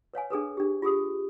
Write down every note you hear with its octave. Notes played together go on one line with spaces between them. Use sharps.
B4 C#5 F5 G#5
D4 G#4 A4 B4
D4 G4
F4 G4 G#4 D#6